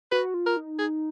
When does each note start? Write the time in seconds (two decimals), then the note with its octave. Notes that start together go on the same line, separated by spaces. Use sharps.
0.11 F#4 B4
0.34 F4
0.46 A#4
0.57 D#4
0.79 G#4